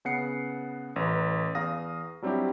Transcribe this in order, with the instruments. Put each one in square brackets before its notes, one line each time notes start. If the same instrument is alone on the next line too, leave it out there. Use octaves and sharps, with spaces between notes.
[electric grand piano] C#3 B3 F#5 C7 C#7
A1 B4
E2 F5 D#6 A#6
F#3 G3 C4 D4 E4 G4